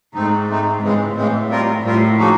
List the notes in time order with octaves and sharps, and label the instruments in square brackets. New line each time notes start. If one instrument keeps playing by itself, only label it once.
[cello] G#2 [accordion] A3 C4 D#4
[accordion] A3 C4 D#4
[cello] G#2 [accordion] C#3 E3 G#3 C4
[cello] A2 [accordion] C#3 E3 G#3 C4
[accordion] G3 C4 F4 A#4
[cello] A2 [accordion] G3 C4 F4 A#4
[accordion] C#3 F3 A#3 D#4 F#4